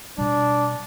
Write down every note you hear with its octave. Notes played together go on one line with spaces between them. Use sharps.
B2 G3 D4